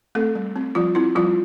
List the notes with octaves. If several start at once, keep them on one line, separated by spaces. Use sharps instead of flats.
A3 C4 A4
G3
C4
F3 G3 F4
C4 E4
F3 G3 F4